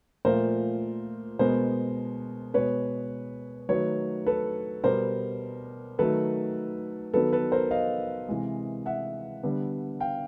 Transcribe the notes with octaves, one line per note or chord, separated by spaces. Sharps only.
A#2 F3 A3 A#4 C5
B2 G#3 B3 A#4 C5
B2 G#3 B3 B4 C#5
D#3 F#3 A3 B4 C#5
A4 B4
B2 G3 B3 A#4 C5
D#3 F#3 A3 A4 B4
D#3 F#3 B3 A4 B4
A4 B4
A#4 C5
D#5 F5
C3 E3 G#3
E5 F#5
D3 G3 B3
F5 G5